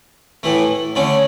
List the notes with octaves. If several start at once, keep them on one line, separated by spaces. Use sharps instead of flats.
A2 E3 A3
D3 A3 C#4